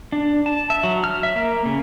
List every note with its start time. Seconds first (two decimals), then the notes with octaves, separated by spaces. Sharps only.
0.12 D4
0.46 A5
0.70 E5
0.83 F#3
1.04 F6
1.23 E5
1.36 A#3
1.66 C#3